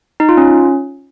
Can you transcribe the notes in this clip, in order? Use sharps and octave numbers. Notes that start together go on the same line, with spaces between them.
D#4
F4
C#4